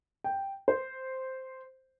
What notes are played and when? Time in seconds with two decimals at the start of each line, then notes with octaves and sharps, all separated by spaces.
0.24 G5
0.68 C5